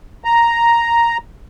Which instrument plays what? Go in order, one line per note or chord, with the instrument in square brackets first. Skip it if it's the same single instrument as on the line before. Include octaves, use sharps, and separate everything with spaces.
[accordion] A#5